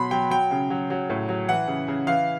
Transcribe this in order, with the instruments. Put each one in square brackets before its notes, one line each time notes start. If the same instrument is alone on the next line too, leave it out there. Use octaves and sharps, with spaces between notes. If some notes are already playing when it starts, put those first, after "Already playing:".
Already playing: [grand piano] B2 F#3 B5 C6
F#3 G5
F#3 G5
C#3
F#3
F#3
A2
F#3
E3 F#5
C#3
C#3
E3 F5